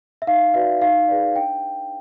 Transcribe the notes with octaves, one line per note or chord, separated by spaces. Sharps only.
E5
D#4 F5
F#4 B4 D5 E5
D#4 F5
G#4 B4 D5
D4 G5